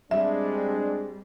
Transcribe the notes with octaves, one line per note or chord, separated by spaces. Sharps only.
G3 G#3 C4 D4 E5